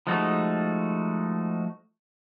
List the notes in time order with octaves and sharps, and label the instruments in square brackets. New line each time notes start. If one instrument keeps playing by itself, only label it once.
[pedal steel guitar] F3 G#3 A3 D#4 F#4